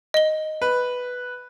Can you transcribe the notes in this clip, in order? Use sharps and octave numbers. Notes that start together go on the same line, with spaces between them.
D#5 G7
B4